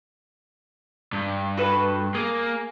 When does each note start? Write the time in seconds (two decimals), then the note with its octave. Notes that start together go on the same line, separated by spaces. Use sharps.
1.13 G2
1.58 F#4 A4 B4
2.15 A#3 G#4